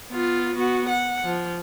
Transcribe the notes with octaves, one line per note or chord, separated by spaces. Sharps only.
B3 F4
B3 F#4
F#5
F3